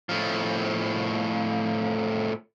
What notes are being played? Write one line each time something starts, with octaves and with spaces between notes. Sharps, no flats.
A2 F3